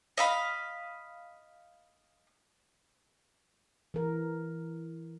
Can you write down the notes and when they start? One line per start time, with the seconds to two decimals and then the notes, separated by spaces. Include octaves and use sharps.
0.18 D#5 F5 B5
3.94 E3 A#4